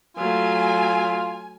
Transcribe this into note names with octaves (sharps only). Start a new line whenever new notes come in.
F#3 A3 F4 G#5